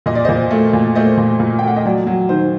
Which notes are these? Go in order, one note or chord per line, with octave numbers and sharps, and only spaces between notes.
A#2 D#5
D5
A#2 C5 D#5
A3
A#2
A3 C5 D#5
A#2
A#2
G5
A3 F#5
D#5
F#3 D5
F#3
D#3 C5